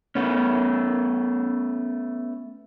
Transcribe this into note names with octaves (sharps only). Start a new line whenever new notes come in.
A3 B3 C#4